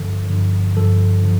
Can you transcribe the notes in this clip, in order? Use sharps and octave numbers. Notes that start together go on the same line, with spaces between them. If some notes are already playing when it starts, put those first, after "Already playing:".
Already playing: G2 D3 F3 A4
G2 D3 F3
G2 D3 F3 A4
D3 F3